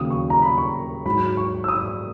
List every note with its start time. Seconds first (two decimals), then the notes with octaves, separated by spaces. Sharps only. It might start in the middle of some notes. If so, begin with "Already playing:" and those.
Already playing: D#2 C#3 F#3 D#6
0.10 C#6
0.30 A#5
0.42 B5
0.58 C#6
1.05 G#2 F#3 B5
1.37 C#6
1.64 E6
1.68 D#6